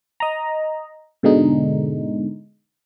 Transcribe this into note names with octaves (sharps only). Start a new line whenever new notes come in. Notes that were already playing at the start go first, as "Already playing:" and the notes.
D#5 A#5
G#2 B2 D3 G#3 D#4